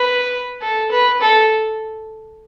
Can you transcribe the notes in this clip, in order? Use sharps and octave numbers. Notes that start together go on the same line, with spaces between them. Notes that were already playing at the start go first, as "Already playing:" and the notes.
Already playing: B4
A4
B4
A4